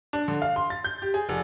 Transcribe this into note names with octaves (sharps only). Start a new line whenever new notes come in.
D4
D3
F5
C6
A6
G6
G4
G#4
F1